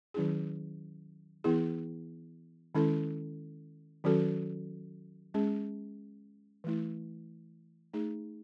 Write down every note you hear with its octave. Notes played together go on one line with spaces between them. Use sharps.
D#3 F#3 C#4 E4 G#4
E3 B3 E4 G#4
D#3 G#3 C#4 E4 A4
D#3 F#3 C#4 F#4 A4
G#3 C#4 G#4
E3 A3 E4
A3 D#4 G#4